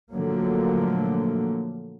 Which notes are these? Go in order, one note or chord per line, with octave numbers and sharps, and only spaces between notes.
A#2 D3 F3 F#3 A3 A#3